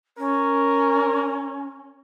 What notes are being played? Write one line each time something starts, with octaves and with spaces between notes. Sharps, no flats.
C#4 A#4